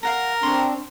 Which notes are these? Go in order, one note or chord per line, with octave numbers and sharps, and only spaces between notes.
A#4 F5 F#5 A#5
C4 D4 C6 C#6